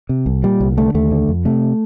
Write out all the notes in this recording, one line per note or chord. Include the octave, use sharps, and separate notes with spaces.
C3
C2
A#2 G3
C2
D3 A3
D#2 A3
D3
F2
C3 A3